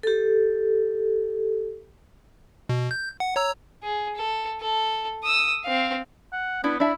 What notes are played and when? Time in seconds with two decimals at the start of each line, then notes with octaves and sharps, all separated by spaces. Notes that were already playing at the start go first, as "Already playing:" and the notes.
0.03 G4 A4
2.69 B2
2.91 G6
3.20 F#5
3.36 C#5 A#5 E6
3.83 G#4
4.16 A4
4.61 A4
5.24 D#6 E6
5.64 C4 F5
6.33 F#5
6.64 B3 D4 E4
6.80 D4 E4 E5 A5